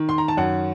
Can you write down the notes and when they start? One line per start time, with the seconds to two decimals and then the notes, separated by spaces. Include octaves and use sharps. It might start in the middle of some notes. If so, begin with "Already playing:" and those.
Already playing: D#3
0.09 C6
0.18 A#5
0.28 A5
0.37 F#2 F#5